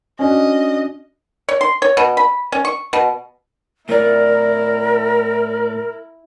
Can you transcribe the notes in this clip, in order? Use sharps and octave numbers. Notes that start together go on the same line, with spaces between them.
C#4 D4 F#4 D#5
C#5
C6
C#5
B2
B5
C#4
C#6
B2
A2 E4 A#4 D5